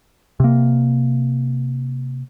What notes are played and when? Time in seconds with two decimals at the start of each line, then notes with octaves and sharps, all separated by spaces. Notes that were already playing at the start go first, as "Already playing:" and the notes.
0.40 C3 A#3